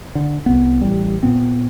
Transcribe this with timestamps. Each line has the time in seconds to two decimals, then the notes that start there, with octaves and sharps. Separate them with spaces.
0.15 D3
0.46 C2 B3
0.81 A1 G3
1.23 A#2 B3 C4